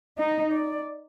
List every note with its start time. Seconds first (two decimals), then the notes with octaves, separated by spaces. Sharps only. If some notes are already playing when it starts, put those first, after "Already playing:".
0.18 D#4 D#5
0.53 D5